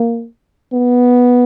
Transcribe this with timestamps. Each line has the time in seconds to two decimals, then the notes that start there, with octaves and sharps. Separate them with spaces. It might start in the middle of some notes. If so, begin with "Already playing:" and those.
Already playing: A#3
0.73 B3